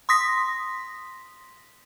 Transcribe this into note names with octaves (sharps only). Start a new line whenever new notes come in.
C6 D#6 A#6 B6